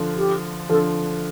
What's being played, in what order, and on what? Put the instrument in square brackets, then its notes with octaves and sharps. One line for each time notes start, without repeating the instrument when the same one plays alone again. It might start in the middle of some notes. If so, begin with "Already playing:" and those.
Already playing: [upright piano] D3 F3
[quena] G4
[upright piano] D3 F3 [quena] A4